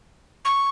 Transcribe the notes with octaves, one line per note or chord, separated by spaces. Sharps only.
C#6